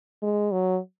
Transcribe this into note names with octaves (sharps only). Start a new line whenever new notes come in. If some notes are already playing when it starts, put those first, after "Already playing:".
G#3
F#3